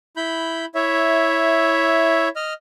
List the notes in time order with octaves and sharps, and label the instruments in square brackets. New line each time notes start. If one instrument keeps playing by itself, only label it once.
[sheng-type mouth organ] E4 B5 G6
E4 C#5 E5
D#5 F6